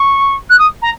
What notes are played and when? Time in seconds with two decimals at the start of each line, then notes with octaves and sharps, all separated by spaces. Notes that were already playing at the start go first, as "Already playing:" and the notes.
Already playing: C#6
0.49 F#6
0.58 D#6
0.82 A#5